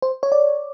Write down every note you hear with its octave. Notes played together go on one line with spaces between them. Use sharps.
C5
C#5
D5